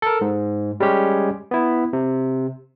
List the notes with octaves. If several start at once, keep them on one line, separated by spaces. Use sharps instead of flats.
A4 A#4
G#2
G3 G#3 C#4 G4
B3 E4
C3